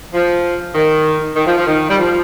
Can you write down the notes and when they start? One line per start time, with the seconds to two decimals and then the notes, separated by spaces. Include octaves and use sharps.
0.14 F3
0.75 D#3
1.36 D#3
1.47 F3
1.57 F3
1.67 D#3
1.89 G3
1.98 F3